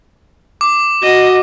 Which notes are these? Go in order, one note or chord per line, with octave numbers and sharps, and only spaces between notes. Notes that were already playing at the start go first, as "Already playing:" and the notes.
D6
F#4 D#5